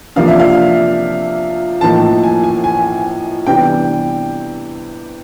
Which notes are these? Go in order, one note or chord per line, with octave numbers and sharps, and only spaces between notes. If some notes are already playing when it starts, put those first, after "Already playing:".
C3 F3 A#3 D4 F5
E5
F5
A2 F3 A#3 D#4 A5
A5
G#5
G#5
G#5
C3 E3 G3 B3 D4 G5